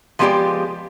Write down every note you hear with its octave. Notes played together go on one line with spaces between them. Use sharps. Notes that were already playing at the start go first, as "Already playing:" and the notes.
F3 G#3 B3 F#4 G4 D5